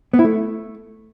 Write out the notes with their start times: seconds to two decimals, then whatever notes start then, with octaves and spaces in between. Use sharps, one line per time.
0.13 B3
0.19 E4
0.24 A3